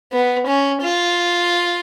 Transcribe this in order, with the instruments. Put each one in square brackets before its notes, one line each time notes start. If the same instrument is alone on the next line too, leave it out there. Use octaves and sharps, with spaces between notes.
[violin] B3
C#4
F4